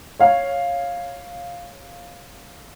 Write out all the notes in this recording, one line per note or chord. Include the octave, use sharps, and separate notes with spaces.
C#5 F5